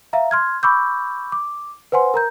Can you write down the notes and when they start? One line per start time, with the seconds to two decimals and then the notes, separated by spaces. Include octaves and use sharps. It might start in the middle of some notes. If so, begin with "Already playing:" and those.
0.13 E5 F5 A#5
0.31 C6 F6 G#6
0.63 B5 C#6 D6 E6 G6
1.32 D6
1.92 B4 C5 F#5 G#5 C6
2.14 A#4 A#5 G6